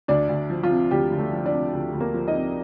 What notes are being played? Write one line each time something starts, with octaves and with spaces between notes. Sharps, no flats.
D2 D4 D5
D2
F3
F3 F4
C3
D2 G3 G4
D2
A3 A4
F3
D4 D5
C3
D2
D2
A#3 A#4
F3
D#4 D#5
C3